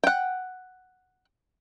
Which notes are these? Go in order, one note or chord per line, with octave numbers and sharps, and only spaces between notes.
F#5 G5